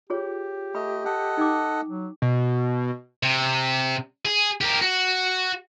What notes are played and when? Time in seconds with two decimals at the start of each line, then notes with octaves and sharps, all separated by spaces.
0.10 F4 G4 G#4 C#5
0.75 A3 D#5 B5
1.05 A4 D#5 F#5
1.37 D#4 G5 D6
1.89 F#3
2.22 B2
3.23 C3
4.25 G#4
4.61 G4 A#4
4.81 F#4